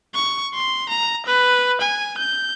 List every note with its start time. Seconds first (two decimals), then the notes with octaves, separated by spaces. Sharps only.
0.14 C#6
0.54 C6
0.89 A#5
1.26 B4
1.81 G#5
2.18 G6